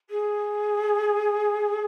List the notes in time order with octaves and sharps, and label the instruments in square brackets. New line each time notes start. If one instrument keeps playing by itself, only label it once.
[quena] G#4